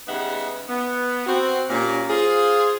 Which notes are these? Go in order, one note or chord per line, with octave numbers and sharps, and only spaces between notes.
C#3 G3 B3 D#4 E5 F#5
B3
C4 F#4
A#2 G3 C#4
F4 G#4 C5